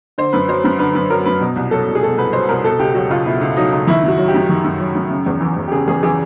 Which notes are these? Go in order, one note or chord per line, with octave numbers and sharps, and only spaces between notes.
D3 C5
F#2 B4
F#3 C5
F#2 B4
D3 B4
F#2 B4
F#3 A#4
F#2 B4
B2
C2
F#3 A4
C2
G#4
B2 A4
C2 B4
F#3 C5
C2 A#4
B2 A4
C#2 G4
F#3 F#4
C#2 F4
B2 E4
C#2
F#3 D#4
C#2
D#3 E4
F#2 F#4
F#3
G4
F#2
D#3
F#2
F#3
F#2
C#3
E2
E3
E2
G4
C#3 G#4
E2 G#4
E3 G#4